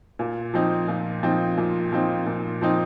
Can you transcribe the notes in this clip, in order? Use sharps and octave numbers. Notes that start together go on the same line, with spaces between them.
A#2
F3 C4 D#4
A#2
F3 C4 D#4
A#2
F3 C4 D#4
A#2
F3 C4 D#4